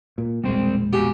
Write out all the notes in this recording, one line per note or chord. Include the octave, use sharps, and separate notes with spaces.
A#2
E1 A#1 G3 G#3 C4 C5
B3 F#4 G4 G#5